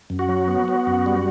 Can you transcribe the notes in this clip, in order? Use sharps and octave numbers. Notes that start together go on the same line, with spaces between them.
F#2
F#4
F#3
B3
B3
F#2
G3